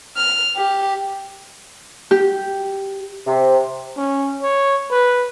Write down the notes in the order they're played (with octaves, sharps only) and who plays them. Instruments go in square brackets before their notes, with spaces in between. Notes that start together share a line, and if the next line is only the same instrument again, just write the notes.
[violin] F6
G4
[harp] G4
[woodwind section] C3
[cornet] C#4
C#5
B4